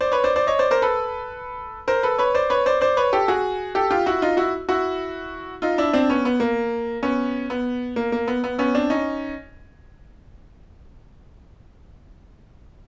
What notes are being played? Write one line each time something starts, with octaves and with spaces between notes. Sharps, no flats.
C5 D5
B4 C#5
C5 D5
C5 D5
C#5 D#5
C5 D5
A#4 C5
A4 B4
A#4 C5
A4 B4
B4 C#5
C5 D5
B4 C#5
C5 D5
C5 D5
B4 C#5
G4 A4
F#4 G#4
G4 A4
F4 G4
E4 F#4
D#4 F4
E4 F#4
E4 F#4
D#4 F4
D4 E4
C4 D4
B3 C#4
B3
A#3
B3 C#4
B3
A#3
A#3
B3
B3
B3 C#4
C4 D4
C#4 D#4